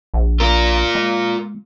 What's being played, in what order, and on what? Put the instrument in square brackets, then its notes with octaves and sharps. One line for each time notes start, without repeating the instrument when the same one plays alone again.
[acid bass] A#1
[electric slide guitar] F4 A#4
[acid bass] G#3